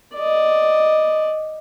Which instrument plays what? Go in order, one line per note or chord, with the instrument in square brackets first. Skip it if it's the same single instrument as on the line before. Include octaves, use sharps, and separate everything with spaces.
[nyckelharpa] D5 D#5